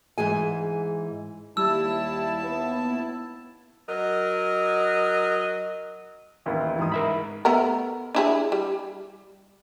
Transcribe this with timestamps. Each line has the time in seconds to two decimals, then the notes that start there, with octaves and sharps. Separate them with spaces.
0.18 G#2 E3 G#4 G#5
1.57 D#2 G3 E4 A5 E6
2.43 B3
3.89 F#3 A#4 D#5
6.46 A1 D#2 E4
6.79 G#2 E3 D#6
6.92 A#4 E5 B5
7.45 A3 B3 A#4
8.15 D4 E4 G#4
8.52 G3